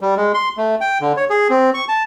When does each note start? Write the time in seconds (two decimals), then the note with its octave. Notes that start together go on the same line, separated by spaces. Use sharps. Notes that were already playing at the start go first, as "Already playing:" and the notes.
0.01 G3
0.17 G#3
0.34 C6
0.57 A3
0.81 G5
1.01 D3
1.17 C#5
1.30 G#4
1.50 C4
1.74 C#6
1.88 A5